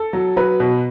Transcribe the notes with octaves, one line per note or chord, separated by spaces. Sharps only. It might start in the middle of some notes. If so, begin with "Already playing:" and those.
Already playing: A4
F#3
F#3 B4
B2